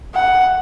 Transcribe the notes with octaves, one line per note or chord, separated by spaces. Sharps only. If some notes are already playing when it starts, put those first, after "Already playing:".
F#5